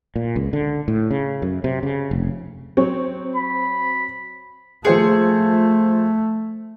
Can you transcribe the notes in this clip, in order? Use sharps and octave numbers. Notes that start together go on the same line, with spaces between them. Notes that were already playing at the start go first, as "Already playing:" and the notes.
A#2
C#2
D3
A2
C#3
F#2
C3
C#3
F1
F#3 C4 C#5
B5
F3 A3 G#4 C5 C#7